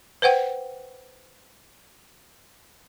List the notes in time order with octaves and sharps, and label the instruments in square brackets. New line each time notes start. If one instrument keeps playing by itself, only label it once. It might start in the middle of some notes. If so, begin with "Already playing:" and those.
[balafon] B4 C5 F#5 G5